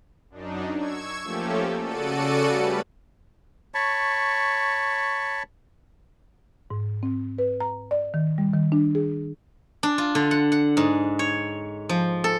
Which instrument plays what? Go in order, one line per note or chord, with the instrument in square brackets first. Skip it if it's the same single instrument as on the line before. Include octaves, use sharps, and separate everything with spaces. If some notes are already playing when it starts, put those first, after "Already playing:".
[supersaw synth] F#2 D4 D#4
C#6 E6 G#6
F3 A3 A#3 C#4 G4 A4
C#3 F#4 A4 D5 C#7 D#7
G3 A3 C#4 B4
[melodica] C#5 A5 B5 C#6
[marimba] G#2
C4
B4
A#5
D5
D#3
G3
D#3
D4
G#4
[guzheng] D4
F4
D3
F#5
F#5
G#2
C#5
F3
A4